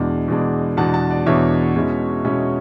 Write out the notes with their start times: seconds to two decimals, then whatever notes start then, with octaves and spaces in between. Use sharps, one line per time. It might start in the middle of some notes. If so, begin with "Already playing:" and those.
Already playing: E2 B2 G#3 D4
0.28 E2 B2 G#3 D4
0.77 E2 B2 G#3 D4 F#5 A5
0.94 F#5 A5
1.11 D5
1.26 E2 B2 G#3 D4 C#5 E5
1.76 B2 G#3 C#4 E4
2.24 B2 G#3 C#4 E4